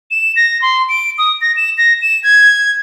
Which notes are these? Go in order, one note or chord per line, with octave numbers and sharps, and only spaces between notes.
E7
A#6
C6
D7
D#6
A#6
E7
A#6
E7
G#6